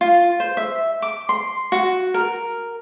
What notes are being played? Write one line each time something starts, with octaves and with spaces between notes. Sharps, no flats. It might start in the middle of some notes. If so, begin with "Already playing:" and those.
F4
C5
E5
D6
C6
F#4
A#4